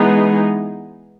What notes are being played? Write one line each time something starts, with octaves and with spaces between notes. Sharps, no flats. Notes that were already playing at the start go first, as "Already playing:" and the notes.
Already playing: E3 G#3 B3 D#4 G#4